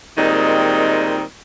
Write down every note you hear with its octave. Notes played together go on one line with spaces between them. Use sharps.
A#2 D#3 G3 G#3 C4 D#4